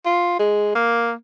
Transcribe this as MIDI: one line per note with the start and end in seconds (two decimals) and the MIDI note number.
0.05 0.35 65
0.39 0.75 56
0.75 1.12 58